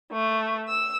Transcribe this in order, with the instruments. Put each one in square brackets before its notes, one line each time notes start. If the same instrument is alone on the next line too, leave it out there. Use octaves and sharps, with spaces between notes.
[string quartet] A3
E6